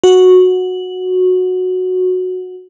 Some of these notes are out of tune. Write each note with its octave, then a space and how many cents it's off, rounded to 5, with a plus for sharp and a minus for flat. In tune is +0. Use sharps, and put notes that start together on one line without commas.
F#4 -10